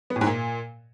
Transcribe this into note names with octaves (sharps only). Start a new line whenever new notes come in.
B3
A2
G#2
A#2